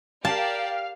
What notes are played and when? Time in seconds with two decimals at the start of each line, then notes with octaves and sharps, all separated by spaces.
0.25 G4 A#4 D5 F5 A5